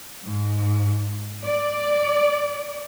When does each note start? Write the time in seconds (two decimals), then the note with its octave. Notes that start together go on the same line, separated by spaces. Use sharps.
0.24 G#2
1.44 D5